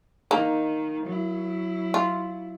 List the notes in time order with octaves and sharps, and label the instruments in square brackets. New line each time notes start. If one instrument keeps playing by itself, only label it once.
[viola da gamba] D#3 [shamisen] A#3 D#4
[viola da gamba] F#3 E4
[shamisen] F4